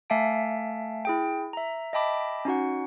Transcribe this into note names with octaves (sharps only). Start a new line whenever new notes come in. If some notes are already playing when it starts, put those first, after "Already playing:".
A3 E5 F5 G#5 A5 D7
E4 G#4 G5
E5 A#5
D#5 E5 G5 A5 B5 D6
C#4 D#4 F#4 F#5